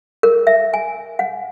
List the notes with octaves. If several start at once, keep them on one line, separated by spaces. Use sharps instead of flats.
A#4
E5
G#5
F#5